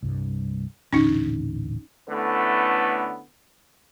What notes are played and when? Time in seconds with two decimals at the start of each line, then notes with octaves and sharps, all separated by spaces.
0.02 C2 G2
0.93 D#1 A1 D3 C#4 D#4
2.10 D3 A3 B3 C#4 E4 B4